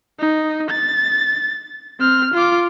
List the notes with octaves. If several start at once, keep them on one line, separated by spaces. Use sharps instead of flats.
D#4
A6
C4 F6
F4 D6